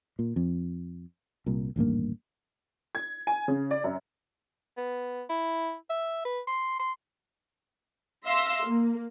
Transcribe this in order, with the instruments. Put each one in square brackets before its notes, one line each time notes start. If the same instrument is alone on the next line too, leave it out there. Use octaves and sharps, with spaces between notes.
[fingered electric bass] A#2
F2
C2 A#2
D#1 A1 G2 A#3
[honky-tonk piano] G#6
G#5
C#3
D5
F#2
[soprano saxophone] B3
E4
E5
B4
C6
C6
[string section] E5 F5 C6 E6 A#6
A#3